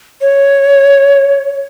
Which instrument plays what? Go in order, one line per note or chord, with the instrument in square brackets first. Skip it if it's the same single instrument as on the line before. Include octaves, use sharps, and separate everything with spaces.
[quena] C#5